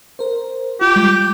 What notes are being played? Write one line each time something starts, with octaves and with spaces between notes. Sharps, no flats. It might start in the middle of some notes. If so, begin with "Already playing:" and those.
A#4 C5
F4 G4
G3 G#3 F4